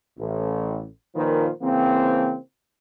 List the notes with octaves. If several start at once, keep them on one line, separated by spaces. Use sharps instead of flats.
A1
A#2 D#3 F3 F4 B4 C5
C#3 E3 A#3 C4